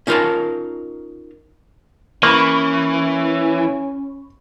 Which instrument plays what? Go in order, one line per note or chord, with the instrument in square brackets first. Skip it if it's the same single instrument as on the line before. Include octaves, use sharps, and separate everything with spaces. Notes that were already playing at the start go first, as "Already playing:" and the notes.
[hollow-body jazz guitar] C#4 D#4 F4 A#4 G#5 A5
[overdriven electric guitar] E3 [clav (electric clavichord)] A#3 [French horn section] C#4 [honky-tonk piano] B5 C#6